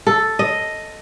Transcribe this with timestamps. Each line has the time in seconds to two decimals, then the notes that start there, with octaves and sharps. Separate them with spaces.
0.07 A4
0.39 D#5